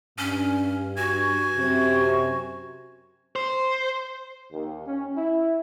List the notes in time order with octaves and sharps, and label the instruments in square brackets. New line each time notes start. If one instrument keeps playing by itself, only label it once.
[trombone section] G2 [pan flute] C#4
[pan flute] F#4 [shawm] G#5
[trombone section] F#2 C3
[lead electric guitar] C5
[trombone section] D#2
C#4
E4